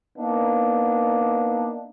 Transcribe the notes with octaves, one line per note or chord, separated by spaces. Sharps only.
A#3 B3 D4 D#4